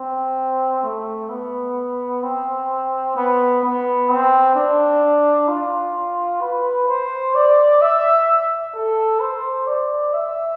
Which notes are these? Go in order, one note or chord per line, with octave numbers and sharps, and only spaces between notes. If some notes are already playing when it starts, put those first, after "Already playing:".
Already playing: C4
A3
B3
C4
B3
B3
C4
D4
F4
B4
C5
D5
E5
A4
C5
D5
E5